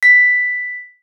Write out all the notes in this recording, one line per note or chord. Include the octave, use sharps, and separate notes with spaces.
B6